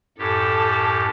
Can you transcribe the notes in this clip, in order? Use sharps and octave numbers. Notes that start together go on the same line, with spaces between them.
F#2 A2 G4 A4 A5